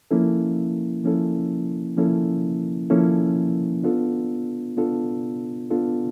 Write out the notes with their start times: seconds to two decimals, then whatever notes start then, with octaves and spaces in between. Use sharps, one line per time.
0.11 F3 A#3 C#4 E4 A4
1.04 F3 A#3 C#4 E4 A4
1.97 F3 A#3 C#4 E4 A4
2.90 F3 A#3 C#4 E4 A4
3.84 B3 D4 F4 A4
4.77 B3 D4 F4 A4
5.70 B3 D4 F4 A4